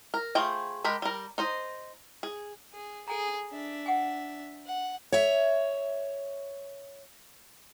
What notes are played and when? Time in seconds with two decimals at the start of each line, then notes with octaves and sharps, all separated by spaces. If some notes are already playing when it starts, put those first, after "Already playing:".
0.14 A#4
0.35 A3 F4 G#4 C5 G5
0.84 G#3 G4 A#4 B5
1.02 G3 A#4
1.38 D#4 C5 D#5
2.23 G#4
2.73 G#4
3.08 G#4 A4 G#5 A#5
3.52 D4 E5
3.86 F#5 G#5
4.65 F#5
5.12 C#5 E5